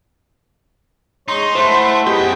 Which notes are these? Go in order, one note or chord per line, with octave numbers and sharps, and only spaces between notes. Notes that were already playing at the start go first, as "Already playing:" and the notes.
G#3 D#4 C#5 C6
A3 E4 C5 F#5
F#2 B3 G4 G#4 D#5 G5